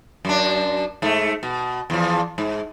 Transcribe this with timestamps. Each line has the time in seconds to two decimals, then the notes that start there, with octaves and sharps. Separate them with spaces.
0.25 F#2 D4
1.02 G#2 A3
1.43 B2
1.90 E2 F3
2.38 G#2